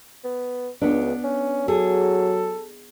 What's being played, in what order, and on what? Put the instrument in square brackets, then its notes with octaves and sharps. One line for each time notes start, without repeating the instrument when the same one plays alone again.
[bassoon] B3
[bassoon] C#2 [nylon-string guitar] B3 D4
[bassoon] C#4
[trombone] F#3 [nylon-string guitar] G#4 [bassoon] A4